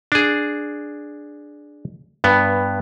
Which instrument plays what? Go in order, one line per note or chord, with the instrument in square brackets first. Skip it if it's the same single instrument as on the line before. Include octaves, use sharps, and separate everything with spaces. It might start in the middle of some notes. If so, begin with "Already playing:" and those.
[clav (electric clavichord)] D4 G#4
G2 B3